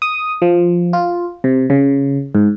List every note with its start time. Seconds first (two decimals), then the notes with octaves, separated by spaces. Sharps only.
0.02 D#6
0.42 F3
0.93 F4
1.44 C3
1.70 C#3
2.35 G#2